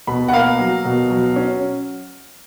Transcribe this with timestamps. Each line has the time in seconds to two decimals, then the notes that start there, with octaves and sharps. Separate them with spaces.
0.07 B2 B5
0.28 F#5
0.33 A#3 F5
0.59 F#3
0.85 B2
1.10 F#3
1.36 C#4